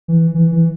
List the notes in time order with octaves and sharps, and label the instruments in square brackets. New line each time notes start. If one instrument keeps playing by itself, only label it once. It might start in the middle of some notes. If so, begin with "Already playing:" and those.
[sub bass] E3
E3
E3